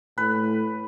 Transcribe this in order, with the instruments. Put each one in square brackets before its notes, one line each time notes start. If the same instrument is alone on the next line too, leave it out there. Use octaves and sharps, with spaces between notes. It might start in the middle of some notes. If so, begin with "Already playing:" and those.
[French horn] A2 [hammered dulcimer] B4